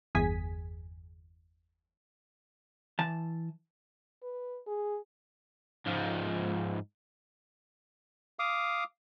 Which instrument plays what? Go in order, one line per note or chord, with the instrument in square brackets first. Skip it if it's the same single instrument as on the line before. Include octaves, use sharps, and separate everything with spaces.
[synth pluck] G1 E2 G#4 G#5 B6
[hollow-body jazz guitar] E3 A5
[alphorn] B4
G#4
[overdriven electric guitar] G#2 F3
[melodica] F5 D6 D#6